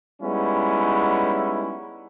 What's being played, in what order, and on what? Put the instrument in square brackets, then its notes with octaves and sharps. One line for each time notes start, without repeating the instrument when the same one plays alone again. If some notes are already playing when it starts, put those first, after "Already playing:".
[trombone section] G3 G#3 B3 C#4 D#4 E4